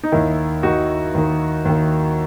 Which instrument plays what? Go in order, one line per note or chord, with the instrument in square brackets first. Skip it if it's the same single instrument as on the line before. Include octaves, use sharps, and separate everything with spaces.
[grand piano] D#4
D#2 D#3 E4
D#2 D#3 D#4 F#4
D#2 D#3
D#2 D#3